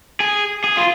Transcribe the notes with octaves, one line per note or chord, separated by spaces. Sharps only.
G#4
G#4
F4